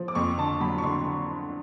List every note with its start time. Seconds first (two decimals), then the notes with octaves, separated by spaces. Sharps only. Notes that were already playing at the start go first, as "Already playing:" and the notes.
Already playing: F3
0.08 D6
0.15 F2 C#6
0.38 D3 A5
0.60 F#3 B5
0.78 C#6
0.84 D3 C6